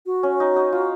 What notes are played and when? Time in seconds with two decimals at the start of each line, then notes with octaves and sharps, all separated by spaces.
0.06 F#4
0.23 C#4
0.40 D#4
0.56 D#4
0.73 F4